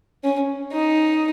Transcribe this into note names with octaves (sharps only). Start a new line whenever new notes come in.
C#4
D#4